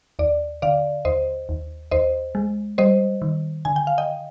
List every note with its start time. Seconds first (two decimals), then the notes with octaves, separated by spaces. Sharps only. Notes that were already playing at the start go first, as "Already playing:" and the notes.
0.19 D#2 D5
0.62 D3 D5 F5
1.05 D#2 C5 D#5
1.49 D#2
1.91 D#2 C5 D#5
2.35 G#3
2.78 G3 C5 D#5
3.22 D#3
3.65 D3 G#5
3.76 G5
3.87 F5
3.98 D#5 G5